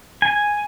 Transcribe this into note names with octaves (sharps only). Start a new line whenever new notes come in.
G#5